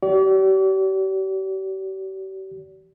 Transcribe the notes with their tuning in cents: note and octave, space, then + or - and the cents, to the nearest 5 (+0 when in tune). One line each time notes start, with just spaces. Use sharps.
G4 -40 D5 -40